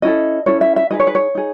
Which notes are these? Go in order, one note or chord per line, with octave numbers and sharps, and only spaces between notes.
C#4 E4 A4 D#5
C#4 E4 A4 C#5
E5
E5
D#4 G#4 B4 D#5
C#5
B4
C#5
D#4 G#4